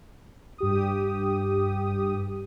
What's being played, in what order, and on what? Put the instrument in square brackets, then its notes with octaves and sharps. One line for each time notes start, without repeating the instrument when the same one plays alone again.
[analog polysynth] G2 G4 D#6